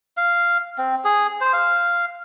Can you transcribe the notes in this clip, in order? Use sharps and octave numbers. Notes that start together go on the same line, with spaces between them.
F5
C4
G#4
C5
F5